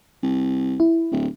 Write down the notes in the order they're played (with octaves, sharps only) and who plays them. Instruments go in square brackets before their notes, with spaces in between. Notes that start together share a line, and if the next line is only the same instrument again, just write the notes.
[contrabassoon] C2
[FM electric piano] E4
[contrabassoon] D1